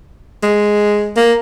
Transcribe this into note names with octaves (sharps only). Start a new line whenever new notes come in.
G#3
A#3